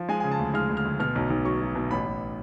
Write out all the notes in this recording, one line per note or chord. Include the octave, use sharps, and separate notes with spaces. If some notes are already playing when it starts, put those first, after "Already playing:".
Already playing: F3
G#3 G#5
C#3 G#5
A5
D2
G#3 F6
D2
F6
D2
B2 F6
B1
B1
F#3 C#6
F#3
B2
A1 B5
A1